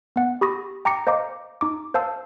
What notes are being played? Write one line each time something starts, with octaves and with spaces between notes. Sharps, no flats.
B3 F#5
G4 B5 C#6 D#6 A#6
G5 A#5 D6 A#6 C#7
C5 D#5 F5 A#5 D6
D#4 D6
C5 F5 A5 E6